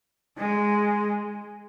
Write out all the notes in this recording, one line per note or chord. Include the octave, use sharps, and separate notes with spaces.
G#3